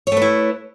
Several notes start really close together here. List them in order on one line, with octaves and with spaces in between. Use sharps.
C#5 A3 B4 E4